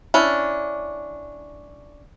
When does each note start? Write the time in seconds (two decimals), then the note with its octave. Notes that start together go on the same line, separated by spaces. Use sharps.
0.14 C#4 D4 E4